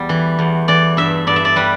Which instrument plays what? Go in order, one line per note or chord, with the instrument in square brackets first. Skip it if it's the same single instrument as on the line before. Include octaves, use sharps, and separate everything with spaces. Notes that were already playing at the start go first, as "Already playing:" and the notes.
Already playing: [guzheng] E2 G3
E3
E2
E3 D5
G2 E5
G2 D5
E5
D5
G3 B4